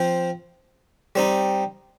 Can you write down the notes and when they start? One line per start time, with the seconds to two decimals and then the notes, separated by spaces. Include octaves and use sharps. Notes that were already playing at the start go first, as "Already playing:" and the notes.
Already playing: F3 C4 F4 C5
1.15 G3 C4 D#4